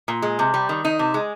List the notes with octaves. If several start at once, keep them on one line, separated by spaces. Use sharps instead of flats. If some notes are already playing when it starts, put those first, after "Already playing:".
A#2
G#3
C3
G3
D#3
D#4
C3
G#3